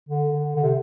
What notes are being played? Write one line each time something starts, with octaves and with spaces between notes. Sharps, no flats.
D3
D3
D3
C3